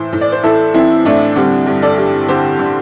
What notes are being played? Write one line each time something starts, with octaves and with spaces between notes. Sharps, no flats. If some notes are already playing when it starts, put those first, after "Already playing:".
Already playing: A2 E3 C5
A2
D5
C5
E3 E4 A4
E3 C4 E4
A2 A3 D4
D3 G3 C4
G2
A4 D5
G2
D3 G4 C5
D3